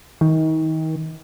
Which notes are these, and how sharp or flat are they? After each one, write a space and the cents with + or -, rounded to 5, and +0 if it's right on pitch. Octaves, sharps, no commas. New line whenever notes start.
D#3 +35